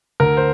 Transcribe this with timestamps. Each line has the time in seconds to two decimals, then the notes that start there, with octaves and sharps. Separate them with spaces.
0.20 D2 A#4
0.37 C5